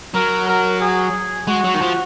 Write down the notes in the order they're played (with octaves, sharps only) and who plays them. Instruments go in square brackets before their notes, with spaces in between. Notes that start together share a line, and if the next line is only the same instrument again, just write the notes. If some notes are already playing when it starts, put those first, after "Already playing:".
[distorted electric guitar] F#3 [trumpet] A#4
[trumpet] A#4
G#4
[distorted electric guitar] G#3 [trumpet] F#4
[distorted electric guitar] F#3
D#3
F3